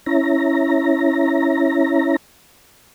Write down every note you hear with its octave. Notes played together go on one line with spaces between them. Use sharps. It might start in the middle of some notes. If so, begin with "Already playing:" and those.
C#4 E4 A#5